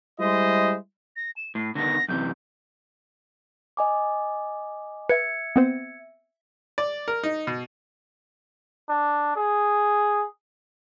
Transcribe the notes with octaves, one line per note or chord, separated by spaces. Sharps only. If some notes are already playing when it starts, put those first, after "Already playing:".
G3 G#3 E4 C5 D#5
A#6
E7
A2 C7
D3 D#3 B3 A#6
F#2 C3 E3 G6
D#5 G#5 D6
B4 E5 G#6 C#7
B3 C4 C5
D5
A#4
D#4
B2
D4
G#4